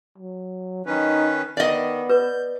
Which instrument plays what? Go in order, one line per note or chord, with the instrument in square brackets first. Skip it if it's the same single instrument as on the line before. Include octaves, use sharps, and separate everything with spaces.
[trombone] F#3
[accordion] D#3 C#4 B4 [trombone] D#4
[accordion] D#3 [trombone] B3 [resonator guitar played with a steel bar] D5 D#5
[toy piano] B4 [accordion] G6